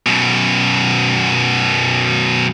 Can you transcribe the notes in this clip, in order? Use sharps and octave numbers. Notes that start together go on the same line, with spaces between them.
F#2 B2